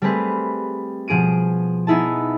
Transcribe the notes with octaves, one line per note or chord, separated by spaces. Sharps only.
G3 A3 C4 G#4 B4
B2 F3 G#4 D7 D#7
B3 D#4 E4 G#4 A5